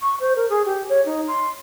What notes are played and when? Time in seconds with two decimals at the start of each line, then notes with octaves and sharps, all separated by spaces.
0.01 C#6
0.20 C5
0.36 A#4
0.50 G#4
0.65 G4
0.89 C#5
1.05 D#4
1.27 C6